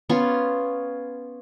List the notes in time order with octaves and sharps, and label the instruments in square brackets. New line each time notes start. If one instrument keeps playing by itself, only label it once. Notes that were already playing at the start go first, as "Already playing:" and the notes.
[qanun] B3 C#4 F4